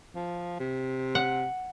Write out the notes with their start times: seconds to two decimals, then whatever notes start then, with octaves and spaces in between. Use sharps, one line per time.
0.15 F3
0.59 C3
1.15 F#5